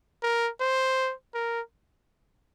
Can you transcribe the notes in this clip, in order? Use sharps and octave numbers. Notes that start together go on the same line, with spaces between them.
A#4
C5
A#4